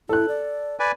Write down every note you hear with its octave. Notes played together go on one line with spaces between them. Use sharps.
E4 A4 F#6
D5
B4 D5 G#5